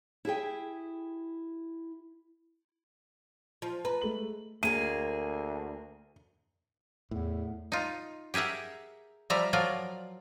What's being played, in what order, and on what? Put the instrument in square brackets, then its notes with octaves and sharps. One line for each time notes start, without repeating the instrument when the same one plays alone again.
[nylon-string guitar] E4 G4 G#4 G5
[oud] F3
[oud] B4 [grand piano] A#5
[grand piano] G#3 A3 F#7
[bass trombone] D2 [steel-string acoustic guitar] A#3 G#4 A#4 [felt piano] D#7
[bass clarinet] E2 [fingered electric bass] A2
[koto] D#4 F4
G4 G#4 A#4 E5 F#5
F3 G3 D5 E5 A#5
F3 F#3 F4 A#4 D5